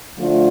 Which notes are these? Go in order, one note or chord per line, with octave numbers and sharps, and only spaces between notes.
D3 F3 A3 F4